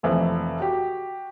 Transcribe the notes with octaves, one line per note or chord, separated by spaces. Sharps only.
F1 E3 F3 A3
F#4 G4